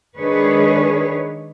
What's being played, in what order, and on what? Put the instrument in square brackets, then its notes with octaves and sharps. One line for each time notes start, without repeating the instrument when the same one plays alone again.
[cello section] D#3 G#3 D4 G#4 B4 C#5